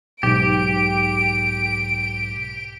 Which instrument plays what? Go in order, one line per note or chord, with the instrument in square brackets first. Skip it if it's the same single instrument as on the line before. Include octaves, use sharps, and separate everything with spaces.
[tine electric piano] B1 G#2 [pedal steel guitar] G4 [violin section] D7